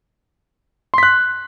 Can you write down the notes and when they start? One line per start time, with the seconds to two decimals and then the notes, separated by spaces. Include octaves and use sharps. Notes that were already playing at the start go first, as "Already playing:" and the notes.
0.94 C6
0.98 B6
1.03 F#6